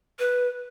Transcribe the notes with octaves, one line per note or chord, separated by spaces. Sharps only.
B4